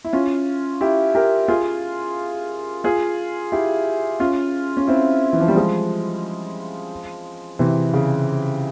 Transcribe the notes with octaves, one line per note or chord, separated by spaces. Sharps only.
E4
C#4 F4
E4 G4
G4 A#4
F4 G#4
F4 G#4
E4 G4
C#4 F4
C#4
C4 E4
E3
F3
G3
F3 G#3
C3 E3
C#3